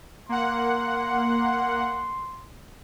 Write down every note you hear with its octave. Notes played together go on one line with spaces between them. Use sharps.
A#3 F#5 C6